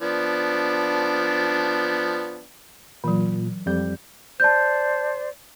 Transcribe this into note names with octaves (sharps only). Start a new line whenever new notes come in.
F3 B3 D4
A#2 E3 F#3
F2 G3 G6
C5 D5 A5 G6